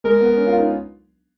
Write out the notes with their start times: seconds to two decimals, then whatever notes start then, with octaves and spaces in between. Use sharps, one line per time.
0.04 G#3 A#4
0.21 B3
0.37 C#4
0.47 F4
0.58 D#4